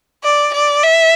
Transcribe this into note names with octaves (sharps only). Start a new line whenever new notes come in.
D5
D5
E5